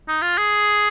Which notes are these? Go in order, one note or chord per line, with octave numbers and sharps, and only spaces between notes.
D#4
F4
G#4